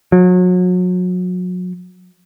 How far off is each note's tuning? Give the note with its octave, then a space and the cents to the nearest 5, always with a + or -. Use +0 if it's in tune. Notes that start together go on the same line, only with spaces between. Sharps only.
F#3 -35